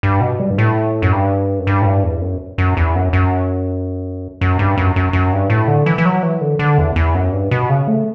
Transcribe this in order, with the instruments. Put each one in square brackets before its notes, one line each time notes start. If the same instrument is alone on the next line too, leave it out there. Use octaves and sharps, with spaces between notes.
[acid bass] G2
B2
G3
G2
A2
F#2
G2
F#2
G2
A2
G2
E2
F#2
F#2
E2
F#2
F#2
F#2
G2
F#2
F#2
F#2
G2
A2
D3
E3
E3
F#3
E3
D3
D3
E2
E2
F#2
G2
B2
C#3
A3